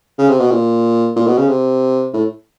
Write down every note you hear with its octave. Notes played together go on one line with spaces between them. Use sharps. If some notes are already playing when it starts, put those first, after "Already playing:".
C#3
C3
B2
A#2
A#2
B2
C#3
C3
A2